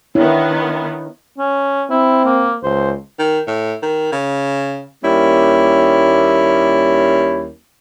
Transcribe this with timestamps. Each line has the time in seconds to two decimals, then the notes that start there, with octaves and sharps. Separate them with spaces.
0.15 D#3 B3 D4 E4 C#5
1.38 C#4
1.90 C4 E4
2.25 A#3
2.63 C#2 C5
3.19 D#3
3.47 A2
3.82 D#3
4.12 C#3
5.03 D#2 G3 A#3 C#4 E4